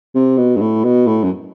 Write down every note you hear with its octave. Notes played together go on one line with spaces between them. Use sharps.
C3
B2
G2
A2
B2
A2
F#2